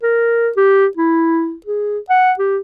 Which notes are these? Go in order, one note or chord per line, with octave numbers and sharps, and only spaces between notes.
A#4
G4
E4
G#4
F#5
G4